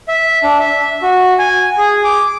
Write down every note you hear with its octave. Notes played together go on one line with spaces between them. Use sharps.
E5
D4
E5
F#4
G#5
G#4
D6